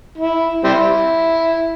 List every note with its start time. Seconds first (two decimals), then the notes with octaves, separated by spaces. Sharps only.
0.18 E4
0.64 G3 C4 E4